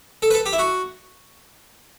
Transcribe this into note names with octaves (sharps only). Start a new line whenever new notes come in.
A4
B4
A4
G4
E4
F#4